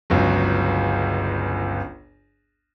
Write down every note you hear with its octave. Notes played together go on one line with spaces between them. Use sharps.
G1 C#2 F#3